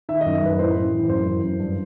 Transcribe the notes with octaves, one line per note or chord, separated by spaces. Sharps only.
D#3 E5
F#2 D#5
E5
F#2 B4
A2 C5
A2
E3
F#2 C5
E3
F#2
G2